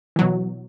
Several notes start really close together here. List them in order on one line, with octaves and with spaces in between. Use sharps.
E3 F#3 B2